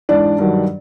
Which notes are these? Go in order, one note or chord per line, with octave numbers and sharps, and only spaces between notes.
G#2 E3 D4 D5
G2 D#3 F#3